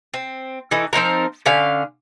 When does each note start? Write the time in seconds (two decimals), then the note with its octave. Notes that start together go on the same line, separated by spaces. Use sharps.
0.14 C4
0.71 E3 A3 D#4
0.93 F3 C4 D#4 A#4
1.46 D3 C#4 F5